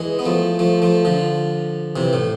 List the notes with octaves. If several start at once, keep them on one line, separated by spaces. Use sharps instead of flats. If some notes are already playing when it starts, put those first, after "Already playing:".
Already playing: E3 G#3
B3
F3 A3
F3 A3
F3 A3
D3 F3
C3 E3
A2